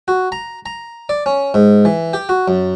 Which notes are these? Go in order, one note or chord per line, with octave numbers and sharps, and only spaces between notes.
F#4
A#5
A#5
D5
C#4
G#2
E3
G4
F#4
F#2